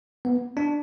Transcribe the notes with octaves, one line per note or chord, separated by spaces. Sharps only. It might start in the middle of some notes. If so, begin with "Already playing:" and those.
B3
D4